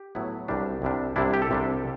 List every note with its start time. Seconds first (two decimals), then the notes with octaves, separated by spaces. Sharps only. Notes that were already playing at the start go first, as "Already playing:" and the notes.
Already playing: G4
0.15 A2 F#3 B3 E4
0.48 C2 C3 G3 D4
0.82 C2 C3 G3 D4
1.16 C2 C3 G3 D4 E4
1.33 G4
1.42 A4
1.51 C2 C3 G3 D4